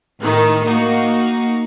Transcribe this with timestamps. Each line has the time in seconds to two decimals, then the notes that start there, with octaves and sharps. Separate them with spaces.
0.21 A2 D#3
0.65 A#3 D#4 F#4